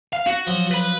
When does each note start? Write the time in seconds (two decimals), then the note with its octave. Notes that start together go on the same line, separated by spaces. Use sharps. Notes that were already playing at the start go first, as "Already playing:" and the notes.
0.13 F5
0.27 F#4
0.47 F3 F#3
0.71 B4 B5